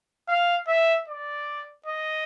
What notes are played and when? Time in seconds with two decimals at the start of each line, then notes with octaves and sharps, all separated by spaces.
0.28 F5
0.68 E5
1.08 D5
1.86 D#5